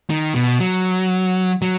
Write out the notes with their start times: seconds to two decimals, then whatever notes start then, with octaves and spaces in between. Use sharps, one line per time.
0.10 D#3
0.35 B2
0.60 F#3
1.62 F#3